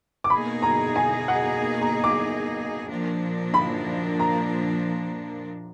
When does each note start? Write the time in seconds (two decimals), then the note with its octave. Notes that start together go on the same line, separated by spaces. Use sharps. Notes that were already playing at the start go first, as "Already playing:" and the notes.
0.24 D6
0.30 B2 A#3 D#4 G#4 B5
0.62 A#5
0.96 G#5
1.28 F#5
1.82 A#5
2.04 D6
2.89 A#2 F3 A#3 D4
3.54 B5
4.19 A#5